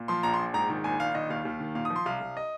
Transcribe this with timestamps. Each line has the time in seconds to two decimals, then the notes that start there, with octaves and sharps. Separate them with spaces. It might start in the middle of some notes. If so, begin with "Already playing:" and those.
Already playing: A#2
0.08 F3 C6
0.23 A#1 A#5
0.34 C6
0.39 A#1
0.54 G#2 A#5
0.70 D#3
0.84 A#1 G#5
0.99 A#1 F5
1.15 D#3 D#5
1.30 D#2 F5
1.45 D#2
1.60 D#3
1.75 A#2 F5
1.85 D#6
1.90 F3
1.96 C6
2.06 C2 F5
2.21 C2
2.37 D#5